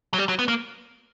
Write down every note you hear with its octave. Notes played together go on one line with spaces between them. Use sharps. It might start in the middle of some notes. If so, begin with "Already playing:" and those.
F#3
G3
F#3
B3
A#3